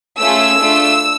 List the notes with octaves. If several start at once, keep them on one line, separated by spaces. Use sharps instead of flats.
A3 C#4 F4 G#4 E6
A3 D4 F4